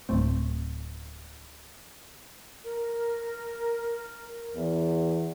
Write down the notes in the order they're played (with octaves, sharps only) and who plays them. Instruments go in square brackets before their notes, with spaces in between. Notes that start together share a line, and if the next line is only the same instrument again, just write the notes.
[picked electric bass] D1 A3 C4
[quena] A#4
[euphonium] E2